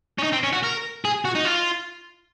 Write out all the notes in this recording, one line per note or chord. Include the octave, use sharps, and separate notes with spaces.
C#4
D#4
C4
C#4
F#4
A#4
G#4
F#4
D#4
F4